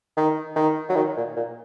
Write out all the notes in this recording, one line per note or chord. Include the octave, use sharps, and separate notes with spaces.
D#3
D#3
F#3
D#3
A#2
A#2